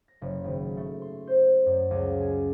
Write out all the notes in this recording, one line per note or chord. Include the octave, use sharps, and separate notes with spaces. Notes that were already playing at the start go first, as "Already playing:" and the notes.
A#6
F#1
G#1
A3
C6
C5
F#2
C#2
G#5